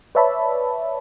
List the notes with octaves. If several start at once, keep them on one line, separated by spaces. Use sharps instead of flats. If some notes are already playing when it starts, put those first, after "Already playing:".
B4 C#5 D5 E5 A5 B5